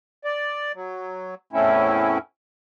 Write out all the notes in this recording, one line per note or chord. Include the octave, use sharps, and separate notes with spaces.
D5
F#3
E2 A2 A3 C4 C#4 E4